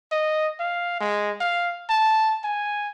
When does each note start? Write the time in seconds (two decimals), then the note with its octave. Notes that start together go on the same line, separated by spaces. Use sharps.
0.12 D#5
0.60 F5
1.00 G#3
1.40 F5
1.89 A5
2.44 G#5